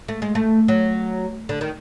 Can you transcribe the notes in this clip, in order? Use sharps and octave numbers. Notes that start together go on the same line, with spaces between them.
A3
G#3
A3
F#3
D3
D#3